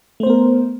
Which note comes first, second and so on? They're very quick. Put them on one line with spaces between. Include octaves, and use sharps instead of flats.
A3 C5 B3 A#4